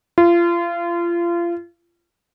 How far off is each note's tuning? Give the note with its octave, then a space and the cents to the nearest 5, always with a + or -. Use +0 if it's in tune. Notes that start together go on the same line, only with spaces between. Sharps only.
F4 -30